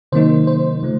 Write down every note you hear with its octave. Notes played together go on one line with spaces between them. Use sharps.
C3 D#3 F#3 A#3 D#4 C5
C5
C#3 F3 A3